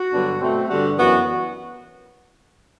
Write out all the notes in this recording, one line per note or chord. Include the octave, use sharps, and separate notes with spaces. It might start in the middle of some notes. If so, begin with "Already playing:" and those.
Already playing: F#4
G2 D3 F#3 B3 D4
B2 A3 C4
G2 D3 G3 F#4
F#2 E3 B3 F#4